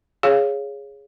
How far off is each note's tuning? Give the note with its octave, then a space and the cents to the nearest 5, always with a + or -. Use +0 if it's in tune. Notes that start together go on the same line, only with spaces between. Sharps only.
G#4 +0 C#5 +0 F5 -5